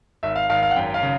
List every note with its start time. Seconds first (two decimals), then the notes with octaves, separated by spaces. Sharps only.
0.23 G#1 E5
0.36 F5
0.50 G#1 F5
0.63 F5
0.71 F#5
0.76 F#2 G5
0.94 F5
1.02 C#3